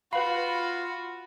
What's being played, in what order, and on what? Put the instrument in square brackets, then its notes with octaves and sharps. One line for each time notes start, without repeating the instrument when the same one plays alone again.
[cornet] F4 [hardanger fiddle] F#4 [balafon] B4 F5 [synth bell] B5